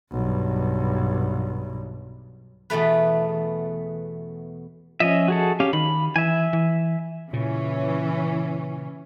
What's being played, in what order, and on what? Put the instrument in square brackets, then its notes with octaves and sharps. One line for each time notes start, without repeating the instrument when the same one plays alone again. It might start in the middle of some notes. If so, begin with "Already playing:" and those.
[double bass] B1 G2
[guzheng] E2 B2 A3 B4
[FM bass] F3 [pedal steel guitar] C#4 D#5 E5
[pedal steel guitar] F#4 G#4 A4
C#4 G4 F5
[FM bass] D#3 [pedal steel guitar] B5
[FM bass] E3 [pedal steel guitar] E5 G#5
[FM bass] E3
[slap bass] A#2 C#3 [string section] E3 C#4